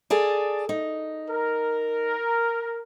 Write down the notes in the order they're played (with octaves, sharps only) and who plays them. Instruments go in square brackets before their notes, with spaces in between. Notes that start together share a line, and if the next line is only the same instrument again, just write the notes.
[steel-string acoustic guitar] G#4 A4 D5
D#4
[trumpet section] A#4